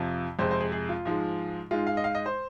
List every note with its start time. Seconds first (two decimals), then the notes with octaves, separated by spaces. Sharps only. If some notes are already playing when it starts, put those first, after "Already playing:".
Already playing: F2 C3 F3
0.39 F2 C3 G#3 C5
0.51 C5
0.61 G#4
0.72 G#4
0.89 F4
1.05 G#2 F3 G#3
1.71 G#2 G#3 F4
1.87 F5
1.97 D#5
2.04 F5
2.15 D#5
2.26 C5